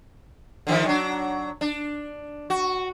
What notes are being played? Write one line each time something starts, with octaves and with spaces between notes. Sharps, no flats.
D3 D#3 F3
F#3 D4
D4
F#4